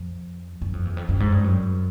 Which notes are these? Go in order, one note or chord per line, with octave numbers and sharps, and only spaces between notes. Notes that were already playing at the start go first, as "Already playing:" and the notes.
Already playing: F2
F#2
F2
E2
F2
F#2
G#2
G2
F#2